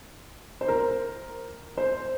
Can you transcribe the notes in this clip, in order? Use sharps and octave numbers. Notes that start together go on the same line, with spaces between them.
C5
A#4
C5